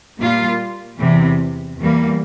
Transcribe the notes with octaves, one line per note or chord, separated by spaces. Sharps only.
A#2 G3 A#3 F4
E2 C3 E3
E2 E3 G3 A#3